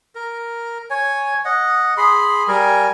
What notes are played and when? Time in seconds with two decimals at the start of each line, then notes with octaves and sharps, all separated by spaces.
0.15 A#4
0.90 C#5 G#5
1.45 D#5 F#5
1.97 G#4 B5 C6
2.48 G3 A#4 G#5